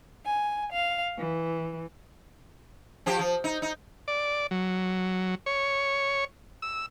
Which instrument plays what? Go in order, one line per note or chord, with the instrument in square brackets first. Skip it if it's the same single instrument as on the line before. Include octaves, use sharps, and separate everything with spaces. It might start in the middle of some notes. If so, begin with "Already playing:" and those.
[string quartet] G#5
F5
E3
[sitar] F3 G4 C5
F3
D#4
D#4
[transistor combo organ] D5
F#3
C#5
E6